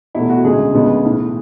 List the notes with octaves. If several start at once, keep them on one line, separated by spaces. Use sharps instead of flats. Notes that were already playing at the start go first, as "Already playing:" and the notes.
E2 B2 A3 E4
F#4
D2 C#3 G#3 G#4
D2 C#3 G#3 B3
B1 A2 E3